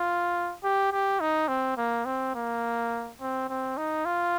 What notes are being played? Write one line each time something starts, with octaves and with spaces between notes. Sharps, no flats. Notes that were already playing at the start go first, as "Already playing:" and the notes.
Already playing: F4
G4
G4
D#4
C4
A#3
C4
A#3
C4
C4
D#4
F4